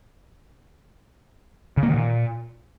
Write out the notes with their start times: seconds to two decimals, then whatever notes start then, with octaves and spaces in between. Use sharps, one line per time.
1.77 C#3
1.83 A#3
1.88 D#3
1.94 A#2